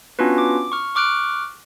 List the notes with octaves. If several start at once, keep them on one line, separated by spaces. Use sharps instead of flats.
B3 C#4 D4 F4 F#4 B4
D6
C#6 F6
C#6 D6 F6 F#6 D7